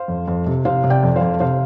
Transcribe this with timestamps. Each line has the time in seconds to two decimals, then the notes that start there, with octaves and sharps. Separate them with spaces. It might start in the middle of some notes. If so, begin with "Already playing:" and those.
Already playing: C5 F5
0.08 F2
0.28 F2
0.46 C3
0.65 C3 C5 F5
0.84 C3
0.90 D5 G5
1.03 F2
1.16 C5 F5
1.21 F2
1.40 C3 C5 F5